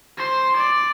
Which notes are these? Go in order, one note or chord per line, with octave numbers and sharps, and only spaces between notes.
C5 C6
D5